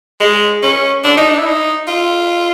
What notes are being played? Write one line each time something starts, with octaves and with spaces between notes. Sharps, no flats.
G#3
C#4
D4
D#4
D4
E4
D#4
F4